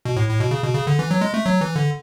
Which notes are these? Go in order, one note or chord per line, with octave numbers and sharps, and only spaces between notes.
B2
A2
A2
B2
C#3
B2
C#3
D3
E3
F#3
G#3
A3
F#3
E3
D3